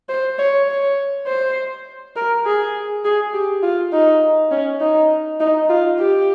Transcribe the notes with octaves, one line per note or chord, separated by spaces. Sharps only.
C5
C#5
C#5
C5
A#4
G#4
G#4
G4
F4
D#4
C#4
D#4
D#4
F4
G4